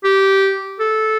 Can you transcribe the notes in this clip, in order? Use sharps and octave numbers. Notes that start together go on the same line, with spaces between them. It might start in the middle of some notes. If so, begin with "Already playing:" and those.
G4
A4